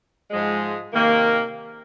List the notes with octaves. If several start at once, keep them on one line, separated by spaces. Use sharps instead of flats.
G#2 F3 G#3
C3 D#3 A#3